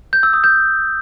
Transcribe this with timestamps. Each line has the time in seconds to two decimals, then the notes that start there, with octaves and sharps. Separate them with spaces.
0.13 G6
0.23 E6
0.33 D#6
0.44 G6